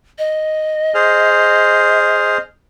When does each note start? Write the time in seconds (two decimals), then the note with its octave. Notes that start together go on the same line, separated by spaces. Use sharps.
0.18 D#5
0.94 G#4 C5 F6